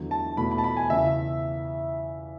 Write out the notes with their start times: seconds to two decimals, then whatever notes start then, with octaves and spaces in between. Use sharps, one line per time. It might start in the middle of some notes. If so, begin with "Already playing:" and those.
Already playing: E2 D3 F#3
0.11 A5
0.37 E2 B2 A3 B5
0.51 B5
0.58 A5
0.64 B5
0.77 G#5
0.90 E2 C#3 E3 E5